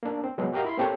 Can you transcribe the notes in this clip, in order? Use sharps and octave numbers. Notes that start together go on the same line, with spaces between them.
A#3 D4
C4
C3 F#3 G#3 B3
F#4 G4 A#4 D#5 F5
E4 B5 C6
A#3 C4 G4 A4 C#5